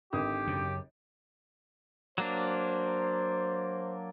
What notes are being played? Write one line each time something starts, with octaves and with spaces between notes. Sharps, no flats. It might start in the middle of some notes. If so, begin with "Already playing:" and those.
G#1 D3 G4 D#6
F#2 C#3
F#3 A#3 D4 C5